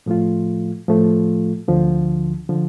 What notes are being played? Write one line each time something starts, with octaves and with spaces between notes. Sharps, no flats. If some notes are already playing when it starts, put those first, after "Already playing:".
A2 F3 A3 F4
A2 F3 A3 F4
D2 D3 F3
D3 F3